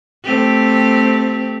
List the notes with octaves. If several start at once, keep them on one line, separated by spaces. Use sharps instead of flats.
A3 C4 G4